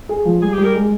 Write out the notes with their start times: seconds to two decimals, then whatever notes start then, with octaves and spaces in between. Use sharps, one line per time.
0.09 G#4
0.25 F3
0.42 G3 G#4
0.53 G4
0.58 G3
0.64 A#4
0.74 G#3